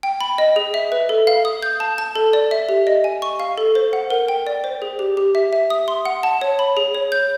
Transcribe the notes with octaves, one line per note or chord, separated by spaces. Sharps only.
G5
B5
D#5
G#4
E5
B4
A4
F5
D#6
G6
A5
A5
A4
D5
E5
G4
D#5
G#5
C#6
F5
A4
C5
F#5
A#4
G5
D5
C5
G#4
G4
G4
E5
E5
D#6
C6
F#5
A5
C#5
B5
G#4
C#5
G6